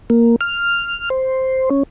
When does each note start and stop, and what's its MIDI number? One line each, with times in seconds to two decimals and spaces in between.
0.10 0.36 58
0.41 1.09 89
1.10 1.69 72
1.70 1.83 61